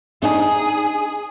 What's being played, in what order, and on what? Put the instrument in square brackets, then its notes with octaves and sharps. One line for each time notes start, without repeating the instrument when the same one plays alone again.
[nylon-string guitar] D4 D#4 [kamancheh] G#4